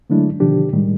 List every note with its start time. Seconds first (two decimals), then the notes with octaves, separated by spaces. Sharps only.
0.10 D3 F#3 G#3 A3 D4 E4
0.40 B2 D3 D#3 F3 D4 G4
0.73 A2 D#3 G3 G#3